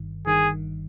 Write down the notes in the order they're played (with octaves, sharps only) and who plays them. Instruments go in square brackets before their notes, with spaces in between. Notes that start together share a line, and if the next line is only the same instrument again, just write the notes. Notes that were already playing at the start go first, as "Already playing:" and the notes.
Already playing: [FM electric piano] G1 G2 D#3
[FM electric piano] G1 G2 D#3 [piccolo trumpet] G#4